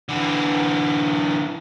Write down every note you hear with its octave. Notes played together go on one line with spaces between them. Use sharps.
D3 E3